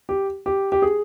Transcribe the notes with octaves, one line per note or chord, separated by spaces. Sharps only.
G4
G4
G4
G#4